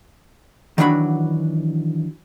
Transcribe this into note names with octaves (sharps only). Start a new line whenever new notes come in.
D#3 E3 F#3 D4 F#4 B5